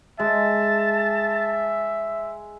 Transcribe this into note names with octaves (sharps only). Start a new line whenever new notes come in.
G#3 E5 A5